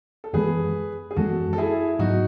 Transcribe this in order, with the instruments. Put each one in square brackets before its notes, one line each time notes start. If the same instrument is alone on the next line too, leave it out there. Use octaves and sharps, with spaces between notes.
[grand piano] A4
[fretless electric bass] F#2 E3 G#3 B3 [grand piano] G#4 B4
[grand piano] G#4
[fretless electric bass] F#2 E3 G#3 B3 [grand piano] F#4 A4
[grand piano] A4
E4 G#4
[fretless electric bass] G#2 F#3 B3 [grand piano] D#4 F#4